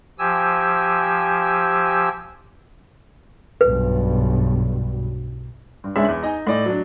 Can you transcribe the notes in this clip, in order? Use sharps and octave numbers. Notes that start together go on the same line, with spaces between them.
F3 G4 G#5 E6
B1 G2 B4
G2
C#2 G#3 C#4 D4 E5
E2
D#4 D#5 G#5
A2 D5 D#5
F#3 D4